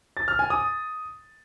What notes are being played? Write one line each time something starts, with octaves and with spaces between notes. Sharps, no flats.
A6
F6
G#5
D#6